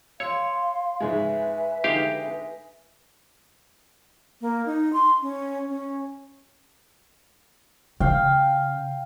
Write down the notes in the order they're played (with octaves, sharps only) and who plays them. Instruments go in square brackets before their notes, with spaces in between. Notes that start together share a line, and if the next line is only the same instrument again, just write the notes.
[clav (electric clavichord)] C#5 [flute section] F5 C6 [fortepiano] E6
[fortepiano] G#2 C#3 G#3 [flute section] B4 E5 G#5
[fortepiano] D3 G#3 D#4 [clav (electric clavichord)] G4 F5
[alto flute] A#3
D#4
C6
C#4
C#4
[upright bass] C#3 [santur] F5 G5